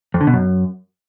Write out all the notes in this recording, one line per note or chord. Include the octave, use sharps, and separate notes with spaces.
F2
D3
B2
F#2